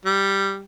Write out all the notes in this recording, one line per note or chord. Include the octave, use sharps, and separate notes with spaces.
G3